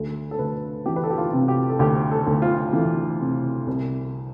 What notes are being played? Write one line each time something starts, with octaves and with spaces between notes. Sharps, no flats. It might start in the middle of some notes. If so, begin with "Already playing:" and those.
Already playing: D2 A4
A4
D2 B4
E3 G4
B4
A4
G4
F4
C3
G4
A4
D2 G4
A4
D2
F4
E3
C3
C2